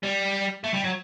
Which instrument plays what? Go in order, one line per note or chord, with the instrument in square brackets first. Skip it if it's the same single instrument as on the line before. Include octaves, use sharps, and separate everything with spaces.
[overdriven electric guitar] G3
A3
G3
F#3